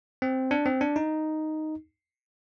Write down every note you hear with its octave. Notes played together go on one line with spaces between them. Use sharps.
C4
D4
C4
D4
D#4